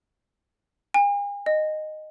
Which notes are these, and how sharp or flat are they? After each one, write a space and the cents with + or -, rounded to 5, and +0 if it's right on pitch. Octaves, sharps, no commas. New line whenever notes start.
G#5 -45
D#5 -10